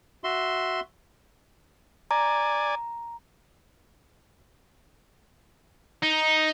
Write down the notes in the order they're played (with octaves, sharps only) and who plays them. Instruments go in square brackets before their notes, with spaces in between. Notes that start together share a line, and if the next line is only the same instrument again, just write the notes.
[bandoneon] F#4 E5 C6
[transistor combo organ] D5 G#5 [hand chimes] A#5
[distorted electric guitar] D#4